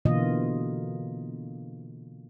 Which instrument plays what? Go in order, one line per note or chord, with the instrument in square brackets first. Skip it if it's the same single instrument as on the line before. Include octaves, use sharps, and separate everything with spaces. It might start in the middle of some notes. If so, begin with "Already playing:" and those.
[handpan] B2 D3 E3 A#3 F4 D#5